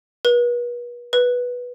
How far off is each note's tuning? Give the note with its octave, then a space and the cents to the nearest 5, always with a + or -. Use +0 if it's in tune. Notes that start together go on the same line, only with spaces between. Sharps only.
B4 -40
B4 -10